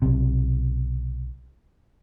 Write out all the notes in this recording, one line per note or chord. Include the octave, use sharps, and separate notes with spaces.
B1 C3